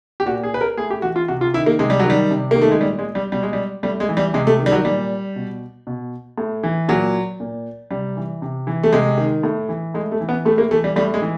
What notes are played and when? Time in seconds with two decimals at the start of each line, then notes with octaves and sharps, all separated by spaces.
0.20 G4
0.26 A#2 F#4
0.43 G#4
0.54 B4
0.61 A#4
0.77 A2 G#4
0.90 G4
1.02 E3 F#4
1.16 F4
1.28 C3 F#4
1.41 F4
1.54 D#3 E4
1.66 A#3
1.79 C3 G#3
1.90 G3
1.99 D#3 F#3
2.10 G3
2.31 C3
2.51 D#3 A#3
2.62 A3
2.71 G#3
2.81 A#2 G3
2.99 G#3
3.15 G3
3.32 B2 G3
3.43 G#3
3.53 G3
3.83 A2 G3
4.00 G#3
4.09 E3
4.17 G3
4.34 C3 G#3
4.47 A3
4.60 D#3
4.66 G3
4.72 F#3
4.85 A#2 G3
5.36 B2
5.87 B2
6.38 A2
6.63 E3
6.88 A#2 F#3
7.40 A#2
7.91 C3 G3
8.17 E3
8.42 C3
8.67 E3
8.83 A3
8.93 C3 G#3
9.18 D#3
9.43 A2
9.69 E3
9.94 A2 G#3
10.12 A3
10.21 E3
10.29 B3
10.45 A2 A3
10.58 A#3
10.71 E3 A3
10.84 G3
10.96 A2 G3
11.14 G#3
11.22 E3